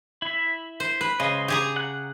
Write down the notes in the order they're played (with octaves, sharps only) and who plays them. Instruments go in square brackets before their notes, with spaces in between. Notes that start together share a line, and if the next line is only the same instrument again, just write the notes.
[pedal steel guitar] E4 E5
[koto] C5
B4
[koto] C#3 [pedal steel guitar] G#3 C5 D#5
[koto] G4 G#4 A#5
[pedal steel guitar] F#5 F#6